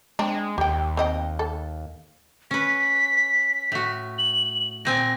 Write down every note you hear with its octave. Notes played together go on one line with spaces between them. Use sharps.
G#3 C4 D4
D#2 G4 G5
C4 D#5 G5
A4
C#4 B4 B6
A2 F#4
F#7
A#2 C4 G#5 A#6